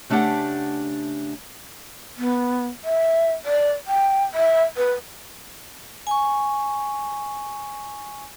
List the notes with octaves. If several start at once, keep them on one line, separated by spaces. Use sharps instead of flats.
C#3 A3 D4 F4 G4 F#5
B3
E5
D5
G5
E5
B4
G#5 C#6